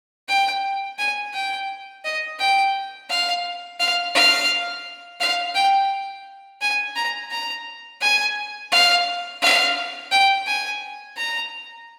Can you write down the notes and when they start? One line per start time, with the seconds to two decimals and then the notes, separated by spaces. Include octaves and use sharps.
0.28 G5
0.99 G#5
1.34 G5
2.05 D#5
2.39 G5
3.09 F5
3.80 F5
4.15 F5
5.20 F5
5.55 G5
6.61 G#5
6.96 A#5
7.31 A#5
8.01 G#5
8.72 F5
9.42 F5
10.12 G5
10.47 G#5
11.17 A#5